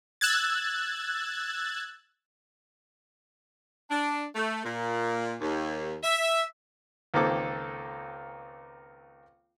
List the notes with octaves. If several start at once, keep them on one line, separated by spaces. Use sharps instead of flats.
E6 F#6 G#6 A6
D4
A3
A#2
D#2
E5
C#2 D#3 A#3 C4 A4 D6